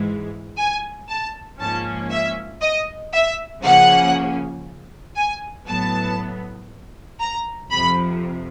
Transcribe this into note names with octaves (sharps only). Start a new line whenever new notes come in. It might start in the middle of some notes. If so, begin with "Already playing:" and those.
Already playing: G#2 E3 G#3
G#5
A5
G#2 F3 A#3 C#4 A5
E5
D#5
E5
C#3 F3 A#3 C#4 F#5
G#5
A2 F#3 B3 A5
A#5
F2 C3 F3 B5